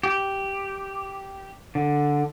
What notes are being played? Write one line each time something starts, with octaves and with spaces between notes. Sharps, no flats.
G4
D3